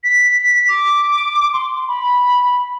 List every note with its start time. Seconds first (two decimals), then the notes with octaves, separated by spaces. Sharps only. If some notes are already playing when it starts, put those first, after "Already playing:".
0.04 B6
0.69 D6
1.54 C6
1.88 B5